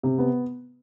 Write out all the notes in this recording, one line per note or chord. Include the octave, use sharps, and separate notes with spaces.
C3
B3